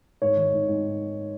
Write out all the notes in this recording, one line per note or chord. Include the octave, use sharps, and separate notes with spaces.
G#2 C#5
D#3
G#2
G#2